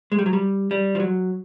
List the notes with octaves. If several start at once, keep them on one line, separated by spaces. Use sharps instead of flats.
G#3
G3
F#3
G3
G3
F3
F#3